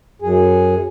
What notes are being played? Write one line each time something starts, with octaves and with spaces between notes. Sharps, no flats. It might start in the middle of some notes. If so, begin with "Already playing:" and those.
F#2 G#4